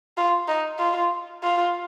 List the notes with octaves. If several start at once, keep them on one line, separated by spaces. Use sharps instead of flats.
F4
D#4
F4
F4